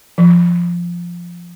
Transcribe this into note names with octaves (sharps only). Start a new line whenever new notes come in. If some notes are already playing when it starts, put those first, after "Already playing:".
F3